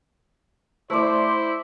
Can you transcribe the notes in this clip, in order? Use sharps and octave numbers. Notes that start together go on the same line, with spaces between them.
A3 E4 C5 D5